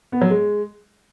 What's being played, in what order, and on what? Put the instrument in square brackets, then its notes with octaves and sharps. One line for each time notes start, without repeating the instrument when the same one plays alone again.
[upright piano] B3
F#3
G#3